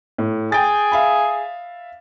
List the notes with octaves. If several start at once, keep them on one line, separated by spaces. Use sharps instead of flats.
A2
G#4 G5 A6
E5 F5 B5